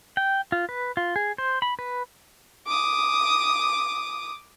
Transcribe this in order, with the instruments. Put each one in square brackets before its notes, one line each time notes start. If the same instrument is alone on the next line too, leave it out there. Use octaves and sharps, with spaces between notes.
[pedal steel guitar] G5
F4
B4
F4
G#4
C5
B5
B4
[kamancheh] D6 D#6